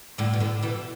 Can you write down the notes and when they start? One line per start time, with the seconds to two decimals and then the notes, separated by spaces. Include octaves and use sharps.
0.18 A2 D3
0.33 B2
0.40 A2 D3
0.62 B2 E3